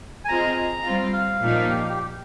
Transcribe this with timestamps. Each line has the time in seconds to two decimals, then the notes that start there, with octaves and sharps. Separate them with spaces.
0.25 G#5
0.28 C4 F4 G#4 D#5 A#5
0.85 G3 C4 F4
1.13 F5
1.42 A#2 F3 A#3 D#4
1.70 G4
1.89 G4